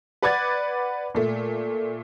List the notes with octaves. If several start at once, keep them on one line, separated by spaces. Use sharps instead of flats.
B4 D5 F#5 D6 G#6 A6
A#2 A3